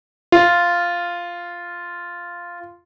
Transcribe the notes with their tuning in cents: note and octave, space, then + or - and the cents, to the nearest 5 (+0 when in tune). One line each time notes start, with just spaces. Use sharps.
F4 -5